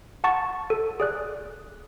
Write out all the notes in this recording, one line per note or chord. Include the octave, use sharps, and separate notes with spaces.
F#5 A5 C#6 A6
A4
G#4 D5 F#6